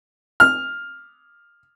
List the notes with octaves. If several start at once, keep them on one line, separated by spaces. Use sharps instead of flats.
F6